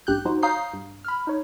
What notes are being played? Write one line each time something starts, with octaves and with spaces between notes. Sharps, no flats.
A1 G2 G4 F#6 G6
F3 D#4 F#4 C5
C#5 F5 A#5 D#6 G6 C7
G2
B5 F6
D#4 C#5